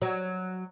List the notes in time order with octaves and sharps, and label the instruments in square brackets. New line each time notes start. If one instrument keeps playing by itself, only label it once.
[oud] F#3